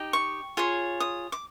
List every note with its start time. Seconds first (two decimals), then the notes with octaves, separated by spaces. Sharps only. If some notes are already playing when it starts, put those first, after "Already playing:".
Already playing: D#4 G4 D#5
0.13 C#6
0.57 F4 G#4 C#5
1.00 D#6
1.32 D6